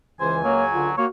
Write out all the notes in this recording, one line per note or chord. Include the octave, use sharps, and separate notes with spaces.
C#2 E3 C5 G#5
F#3 A#3 C#5
D3 F4
A#3 F#4 C#5